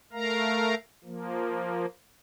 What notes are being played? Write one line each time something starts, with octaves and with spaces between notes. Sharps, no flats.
A3 A#4 F5 A#5
F3 A#3